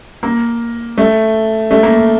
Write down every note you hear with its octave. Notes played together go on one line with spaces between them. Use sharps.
A#3
A3
A3
A#3